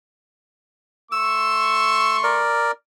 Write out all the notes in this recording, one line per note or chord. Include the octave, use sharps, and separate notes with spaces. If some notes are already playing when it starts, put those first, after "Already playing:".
A3 C6 C#6 E6
A#4 D5